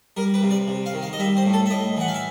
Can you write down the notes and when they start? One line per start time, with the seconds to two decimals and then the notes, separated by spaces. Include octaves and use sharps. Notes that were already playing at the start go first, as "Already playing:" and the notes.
0.17 G3 A#4
0.34 B4
0.43 C3
0.51 D5
0.68 C3
0.86 F5
0.93 D#3
1.03 F5
1.13 D#5
1.19 G3 E5
1.37 C5
1.46 A2
1.53 A4
1.66 E5
1.70 A2 D#5
1.97 E3 F#5
2.08 F5
2.14 E5